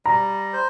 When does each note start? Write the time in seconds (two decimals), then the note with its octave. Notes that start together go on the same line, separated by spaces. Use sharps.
0.06 G3 A#5
0.53 C5